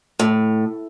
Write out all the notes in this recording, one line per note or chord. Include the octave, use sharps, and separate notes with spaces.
A2